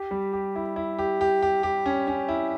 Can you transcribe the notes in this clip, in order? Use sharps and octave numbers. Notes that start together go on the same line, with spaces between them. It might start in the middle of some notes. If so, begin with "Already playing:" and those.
Already playing: G4
G3
G4
E4
E4
G4
G4
G4
G4
C#4
C#4
E4